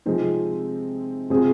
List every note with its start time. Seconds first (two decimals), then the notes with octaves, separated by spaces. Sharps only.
0.06 C3 F3 G#3 C4 D#4
1.30 C3 G#3 C4 F4 G#4